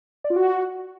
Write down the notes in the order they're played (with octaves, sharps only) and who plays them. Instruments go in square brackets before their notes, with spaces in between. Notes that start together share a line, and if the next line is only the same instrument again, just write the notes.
[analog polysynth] D5
F4
F#4